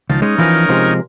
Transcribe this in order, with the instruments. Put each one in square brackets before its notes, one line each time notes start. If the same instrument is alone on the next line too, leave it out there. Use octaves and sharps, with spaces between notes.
[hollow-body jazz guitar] C#2 [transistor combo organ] D#3 F3 A5
[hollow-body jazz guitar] G#3 [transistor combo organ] C#4 D#4
[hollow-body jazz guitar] E3 F3 [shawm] A#4
[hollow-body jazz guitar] C3 F3 G#3